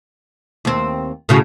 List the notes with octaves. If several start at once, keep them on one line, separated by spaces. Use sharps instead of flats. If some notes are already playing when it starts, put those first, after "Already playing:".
D#2 C4
A2 C#3 F#4